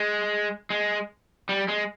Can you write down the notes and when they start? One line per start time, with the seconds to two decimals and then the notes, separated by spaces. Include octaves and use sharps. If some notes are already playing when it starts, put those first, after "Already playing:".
Already playing: G#3
0.70 G#3
1.49 G3
1.68 G#3